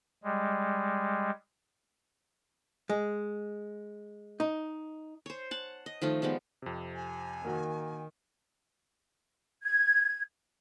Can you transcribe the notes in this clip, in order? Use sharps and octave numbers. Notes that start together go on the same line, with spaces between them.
G3 G#3
G#3
D#4
C5 C#5
F#5 A5
D#5
D#3 F3 A3 F4
F3 G3 G#3 B3
F2 C3
G#5
D#3 A#3 F#4
G#6